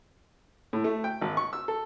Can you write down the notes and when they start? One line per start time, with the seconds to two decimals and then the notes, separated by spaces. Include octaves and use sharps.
0.73 A2
0.84 A3
1.04 G5
1.21 G#1
1.37 C#6
1.53 E6
1.68 A4